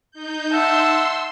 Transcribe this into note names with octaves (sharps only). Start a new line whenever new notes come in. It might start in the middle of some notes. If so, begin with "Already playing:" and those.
D#4 G6
E5 F#5 A5 C6 E6